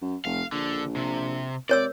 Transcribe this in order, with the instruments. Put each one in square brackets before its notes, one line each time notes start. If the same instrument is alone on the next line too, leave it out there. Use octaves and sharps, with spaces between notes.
[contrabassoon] F#2
[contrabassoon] F1 [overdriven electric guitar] F5
[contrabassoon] A#1 [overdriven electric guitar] D3
[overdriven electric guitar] C3
[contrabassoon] C3 [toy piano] A#4 C#5 E6 [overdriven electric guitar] D5